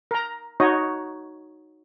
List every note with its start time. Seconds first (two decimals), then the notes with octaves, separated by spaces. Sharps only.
0.11 A#4 A#5
0.60 D#4 F#4 C#5 D#5